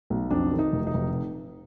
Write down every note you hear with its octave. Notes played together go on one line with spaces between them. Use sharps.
B1
F2 D4
D#3
D#4
F1
D#4
F1